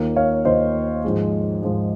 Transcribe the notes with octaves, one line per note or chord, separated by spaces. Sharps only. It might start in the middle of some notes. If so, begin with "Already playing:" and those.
Already playing: D#2 D#3 A#3 F4
C#5 F5
D#2 D#3 A#3 F4 C5 D#5
G#2 F3 G#3
G#2 F3 G#3